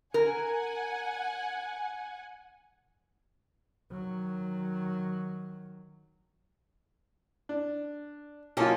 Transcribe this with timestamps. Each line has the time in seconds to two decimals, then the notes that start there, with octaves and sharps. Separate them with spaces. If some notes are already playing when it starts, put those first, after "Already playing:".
0.14 A#4 F#5 G#5
3.91 D#3 F#3
7.49 D4
8.57 B2 F#3 A#3 C#4 F4 A4